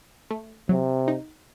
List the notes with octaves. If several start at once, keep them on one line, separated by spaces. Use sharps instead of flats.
A3
C3 F#3
D#4